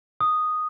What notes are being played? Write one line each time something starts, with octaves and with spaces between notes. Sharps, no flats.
D#6